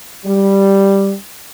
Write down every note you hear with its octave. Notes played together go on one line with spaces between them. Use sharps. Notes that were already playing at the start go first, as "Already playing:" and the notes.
G3